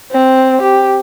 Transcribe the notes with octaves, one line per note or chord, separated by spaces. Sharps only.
C4
G4